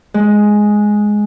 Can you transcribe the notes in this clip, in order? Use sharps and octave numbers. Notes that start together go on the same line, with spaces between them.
G#3